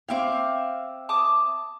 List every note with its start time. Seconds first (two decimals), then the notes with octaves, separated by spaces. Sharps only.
0.08 C4 E5 F5 G5 D6
1.09 A5 D6 D#6